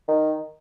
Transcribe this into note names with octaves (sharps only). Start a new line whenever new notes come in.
D#3